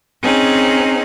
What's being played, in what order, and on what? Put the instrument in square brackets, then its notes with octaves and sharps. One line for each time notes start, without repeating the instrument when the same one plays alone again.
[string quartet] C4 C#4 D#4 G#4